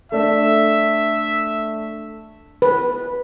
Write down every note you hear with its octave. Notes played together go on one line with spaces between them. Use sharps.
A3 D4 A4 E5
B4